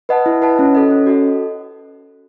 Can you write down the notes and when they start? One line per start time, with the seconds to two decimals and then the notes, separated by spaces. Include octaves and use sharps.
0.09 B4 D#5 F#5 A5
0.26 E4
0.42 B4 D#5 F#5 A5
0.59 C#4
0.75 F#4 A4 D#5
0.90 C#4
1.06 F#4 A4 D#5